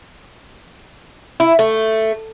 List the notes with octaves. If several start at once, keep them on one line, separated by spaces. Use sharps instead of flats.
E4
A3